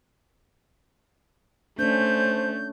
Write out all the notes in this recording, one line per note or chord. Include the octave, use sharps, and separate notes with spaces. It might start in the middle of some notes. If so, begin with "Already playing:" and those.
A3 C#4 D4 C5 G6